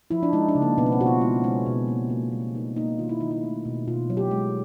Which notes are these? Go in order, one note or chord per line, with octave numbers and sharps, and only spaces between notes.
F3 E4
D4
G#3 D#4
D4
C#3
A#3
B2 B3
C#4
C4
B2 F#4
F4
G#3 E4
G#3 C#4
B2
A#3
A#3
G3
A#3 D#4
A#3 D#4
D#3 F4
E4
D#3 D#4
E4
A3
B2
B2 F4
F#3
G4
G#3